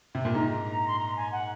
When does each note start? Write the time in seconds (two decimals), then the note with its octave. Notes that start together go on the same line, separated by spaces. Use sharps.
0.15 C3
0.25 A#2
0.35 G#2 A#5
0.88 C6
1.00 A#5
1.17 G#5
1.32 F#5